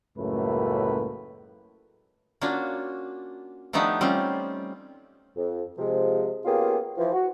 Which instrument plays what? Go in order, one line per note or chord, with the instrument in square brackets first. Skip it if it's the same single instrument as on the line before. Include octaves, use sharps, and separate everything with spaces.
[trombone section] C#2 F#2 A2 A3 A#3 B4
[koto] A#3 C#4 D4 F4 F#4
F3 A3 B3 D4 D#4 G4
G3 C4 C#4 F4
[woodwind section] F2
C3 F3 G#3
A#3 B3 C#4 F4 G4 G#4
E3 F3
F#4